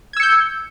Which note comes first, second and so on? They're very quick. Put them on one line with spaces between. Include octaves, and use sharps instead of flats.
G#6 E6 C#7 G6